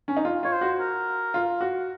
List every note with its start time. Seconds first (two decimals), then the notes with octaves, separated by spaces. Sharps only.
0.08 C#4
0.17 D#4
0.25 F4
0.43 F4 C#5
0.52 C5
0.61 F#4
0.80 A#4
1.34 F4
1.61 F#4